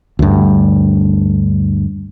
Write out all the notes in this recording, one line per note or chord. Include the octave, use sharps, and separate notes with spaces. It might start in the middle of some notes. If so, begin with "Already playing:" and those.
D2 G2